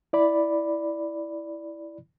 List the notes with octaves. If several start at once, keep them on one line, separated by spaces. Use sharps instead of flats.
E4 D5 B5